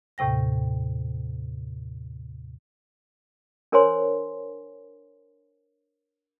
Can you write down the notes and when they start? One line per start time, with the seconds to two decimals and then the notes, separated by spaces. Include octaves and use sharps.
0.18 D#2 A2 C3 G5 A#6
3.72 D4 A#4 C5 C#5 G#5 C6